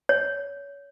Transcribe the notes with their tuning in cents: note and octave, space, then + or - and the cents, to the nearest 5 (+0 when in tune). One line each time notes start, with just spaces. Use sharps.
C#5 +25